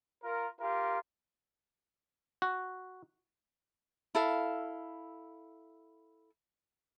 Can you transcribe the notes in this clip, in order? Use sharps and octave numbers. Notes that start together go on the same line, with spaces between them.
F4 A#4
F4 G4 A#4
F#4
E4 A4 F5